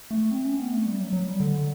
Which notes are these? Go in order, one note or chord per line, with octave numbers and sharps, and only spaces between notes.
A3
C4
C#4
B3
A3
G3
F#3
F#3
G3
D3